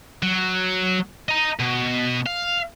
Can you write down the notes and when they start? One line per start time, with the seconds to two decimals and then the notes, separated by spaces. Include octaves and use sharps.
0.23 F#3
1.29 D#5 A#5
1.59 B2
2.26 F5